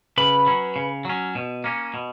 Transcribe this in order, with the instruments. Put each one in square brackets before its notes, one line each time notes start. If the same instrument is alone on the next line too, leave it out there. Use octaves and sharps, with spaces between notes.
[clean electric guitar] C#3 [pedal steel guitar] B4 B5
[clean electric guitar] F#3 C#4
C#3
F#3 C#4
B2
A#3 C#4
B2